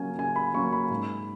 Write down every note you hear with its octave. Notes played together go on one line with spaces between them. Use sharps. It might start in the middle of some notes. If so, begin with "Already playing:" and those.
Already playing: C#3 F#3 A#3 C#4 G#5
C#3 G#5
B5
F#3 A#3 C#4 C#6
B5
G#2